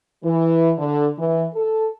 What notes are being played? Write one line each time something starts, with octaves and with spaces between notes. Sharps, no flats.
E3
D3
E3
A4